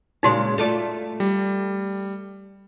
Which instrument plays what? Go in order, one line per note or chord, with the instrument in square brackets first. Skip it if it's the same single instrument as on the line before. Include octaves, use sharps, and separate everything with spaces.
[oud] A#2 C#3 G#3 [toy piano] D#4 F#4 C6
[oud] A3 F4 D5
[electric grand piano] G3